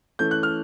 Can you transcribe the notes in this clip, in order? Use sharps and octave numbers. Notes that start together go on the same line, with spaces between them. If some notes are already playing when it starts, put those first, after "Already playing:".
E3 A3 C#4 G6
F#6
F6